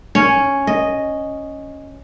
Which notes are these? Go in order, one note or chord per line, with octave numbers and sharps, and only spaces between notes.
C#4
D#5